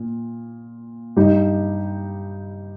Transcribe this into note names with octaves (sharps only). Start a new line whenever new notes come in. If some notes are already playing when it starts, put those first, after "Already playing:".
Already playing: A#2
G2 G3 D#4 G4